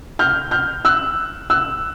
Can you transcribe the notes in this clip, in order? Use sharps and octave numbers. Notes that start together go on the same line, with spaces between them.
F6 G6
F6 G6
E6 F#6
E6 F#6